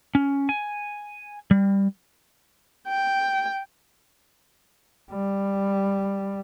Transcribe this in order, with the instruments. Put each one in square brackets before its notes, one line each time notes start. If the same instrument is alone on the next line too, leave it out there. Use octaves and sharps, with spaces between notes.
[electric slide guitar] C#4
G#5
G3
[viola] G5
[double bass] G3